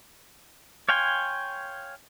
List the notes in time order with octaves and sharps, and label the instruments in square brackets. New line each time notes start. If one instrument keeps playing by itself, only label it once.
[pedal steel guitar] C#5 F5 G5 G#5 C6